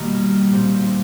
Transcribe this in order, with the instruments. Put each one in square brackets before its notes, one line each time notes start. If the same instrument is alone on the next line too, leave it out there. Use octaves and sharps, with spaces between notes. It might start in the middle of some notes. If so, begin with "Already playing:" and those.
Already playing: [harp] B2 D#3 G3 A#3 D#4
A#2 G3 C4